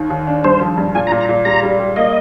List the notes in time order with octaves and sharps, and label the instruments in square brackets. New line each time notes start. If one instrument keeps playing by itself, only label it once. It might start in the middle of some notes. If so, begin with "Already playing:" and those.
Already playing: [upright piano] D#2 D#3
D#2
D4
[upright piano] G2 [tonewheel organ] C5
[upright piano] F3
G2
[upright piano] A#2 [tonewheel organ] G#5
[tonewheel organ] A#5
[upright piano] A#2
[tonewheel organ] A#5
[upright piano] A#2
[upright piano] G3 [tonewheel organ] A#5
[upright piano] G3
G3
[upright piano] A#3 [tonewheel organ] D#5